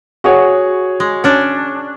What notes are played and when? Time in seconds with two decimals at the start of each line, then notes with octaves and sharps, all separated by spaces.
0.24 F#4 G#4 C#5
1.00 G#3
1.24 C#4 D4